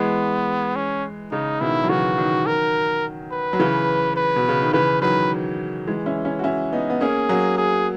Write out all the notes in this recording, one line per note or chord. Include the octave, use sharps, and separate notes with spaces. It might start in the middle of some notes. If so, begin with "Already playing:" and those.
Already playing: E3 G#3 B3
C#4
C#3 D#4
B2 D#3 E4
F#3
C#3 E3 F#4
D#3 F#3
A#4
B4
F#3
C#3 E3
B4
B2
C#3
D#3
C#3 E3 B4
D#3 F#3 B4
E3 G#3
C#4 E4
C#4 E4
F#4
C#4 E4
B3 D#4
B3
A#3 C#4 G#4
F#3 A#3
G#4